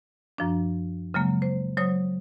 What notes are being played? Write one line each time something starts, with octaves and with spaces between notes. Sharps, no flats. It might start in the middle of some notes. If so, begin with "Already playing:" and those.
F#2 F3 D4
C#3 F#3 G#3 A#3
C5
F#3 C5 C#5 D#6